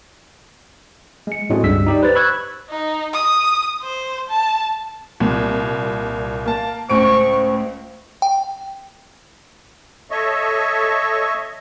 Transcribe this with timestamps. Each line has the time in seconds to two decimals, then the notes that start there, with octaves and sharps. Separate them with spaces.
1.27 G#3 C#7
1.50 A2 G#3 A3 C4 F#4
1.63 C#2 G2 G3 E6 B6
1.86 D#4 G4 D5
2.03 B4 C5 A6
2.15 B5 C#6 E6 F#6 G#6
2.70 D#4
3.14 D#6
3.82 C5
4.29 A5
5.20 C2 A#2
6.46 A#3 A5
6.90 C#2 A2 C5 C#6 D7
8.22 G5
10.11 A4 C#5 D#5 E5 C#6